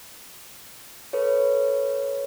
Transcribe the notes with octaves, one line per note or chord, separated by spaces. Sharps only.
A4 B4 C#5